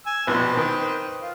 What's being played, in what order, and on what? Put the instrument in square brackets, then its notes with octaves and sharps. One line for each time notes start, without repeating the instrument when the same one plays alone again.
[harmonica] G#5 E6
[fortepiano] A#1 B2 [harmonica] C4 B4 C5
[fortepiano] D#3
[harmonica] F4